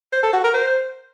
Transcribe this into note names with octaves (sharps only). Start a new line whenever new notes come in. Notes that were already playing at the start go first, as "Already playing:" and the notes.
C5
A4
F#4
A#4
C5